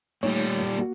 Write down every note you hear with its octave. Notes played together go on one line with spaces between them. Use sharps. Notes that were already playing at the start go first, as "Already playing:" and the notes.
A#2 G3 A3 D#4 C#5
A#3 F#4